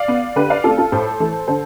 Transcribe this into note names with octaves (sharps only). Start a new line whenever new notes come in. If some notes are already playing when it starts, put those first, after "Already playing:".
Already playing: D5 F5
B3
D3 G4 B4
D5 F5
A3 C4 F4 A4
F4 A4
A2 A4 C5
E3 A3
D3 A4 C5